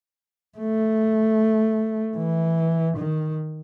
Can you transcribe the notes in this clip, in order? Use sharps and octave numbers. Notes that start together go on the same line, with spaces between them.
A3
E3
D#3